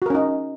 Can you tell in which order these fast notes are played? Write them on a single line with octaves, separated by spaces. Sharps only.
F#4 A#4 C#4 D#4